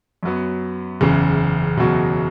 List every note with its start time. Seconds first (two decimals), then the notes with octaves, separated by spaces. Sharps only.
0.23 F#2 F#3 B3
1.01 F#1 E2 C#3
1.78 F#1 E2 B2 F#3